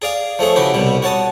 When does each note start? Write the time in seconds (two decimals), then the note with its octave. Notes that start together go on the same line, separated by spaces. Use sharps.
0.02 G#4 D5 F5
0.39 F3 A3 G#4 C#5
0.56 C#3 E3 F#4 G4
0.74 C2 B2 G3
1.02 F#4 C#5 A5 D#6